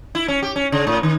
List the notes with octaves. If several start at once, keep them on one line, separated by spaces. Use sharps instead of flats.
E4
C#4
G4
C#4
C#3
A2
D#3